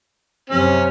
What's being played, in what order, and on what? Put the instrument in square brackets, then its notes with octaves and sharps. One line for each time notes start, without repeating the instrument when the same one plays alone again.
[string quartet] F#2 C3 [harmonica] C#4